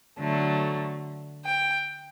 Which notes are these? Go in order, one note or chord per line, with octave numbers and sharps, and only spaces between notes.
D3 F#3 A3
G5